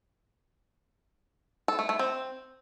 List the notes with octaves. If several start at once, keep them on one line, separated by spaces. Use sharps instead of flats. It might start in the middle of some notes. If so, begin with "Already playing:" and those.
A4
A3
A3
C4